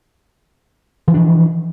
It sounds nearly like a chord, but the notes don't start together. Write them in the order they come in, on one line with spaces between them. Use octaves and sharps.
E3 F3 D4